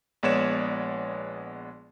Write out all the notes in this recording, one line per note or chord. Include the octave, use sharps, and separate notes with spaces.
A#1 G#3 B3 C#5 D5 E7